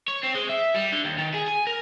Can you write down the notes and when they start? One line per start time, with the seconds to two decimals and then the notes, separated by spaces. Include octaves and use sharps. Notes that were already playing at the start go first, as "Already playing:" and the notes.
0.08 C#5
0.23 C4
0.34 G#3
0.49 E5
0.75 G3
0.92 D3
1.05 D#2
1.18 D#3
1.34 G#4
1.48 G#5
1.67 A#4